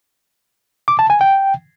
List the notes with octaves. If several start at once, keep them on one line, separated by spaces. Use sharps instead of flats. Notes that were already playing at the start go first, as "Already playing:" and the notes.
D6
A5
G#5
G5